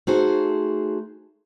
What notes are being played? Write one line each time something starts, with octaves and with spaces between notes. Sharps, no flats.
A3 D#4 F#4 G#4 C5